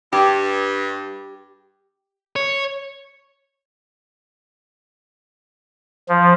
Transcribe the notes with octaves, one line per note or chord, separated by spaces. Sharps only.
G2 G4
C#5
F3